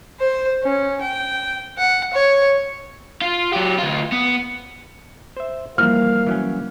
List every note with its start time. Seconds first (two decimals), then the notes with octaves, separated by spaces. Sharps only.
0.20 C5
0.63 C#4
1.01 G5
1.78 F#5
2.14 C#5
3.21 F4
3.53 F#3 G4
3.78 D2 F4
4.12 B3
5.37 C5 E5
5.78 E3 F3 G3 A#3 A#4 F5 F6
6.27 E3 F#3 C#4